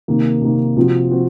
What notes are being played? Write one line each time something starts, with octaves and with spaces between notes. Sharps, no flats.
C3 D#3 A#3
C3 D#3 A#3
C3 F3 C4 F#4
F3 C4 F#4